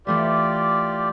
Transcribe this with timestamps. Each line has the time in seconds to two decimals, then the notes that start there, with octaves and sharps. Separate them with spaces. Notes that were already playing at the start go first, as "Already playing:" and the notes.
0.07 E3 A3 F4 G4 B4 D5